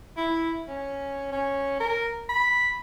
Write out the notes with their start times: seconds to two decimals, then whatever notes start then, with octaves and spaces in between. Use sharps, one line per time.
0.17 E4
0.68 C#4
1.32 C#4
1.80 A#4
2.29 B5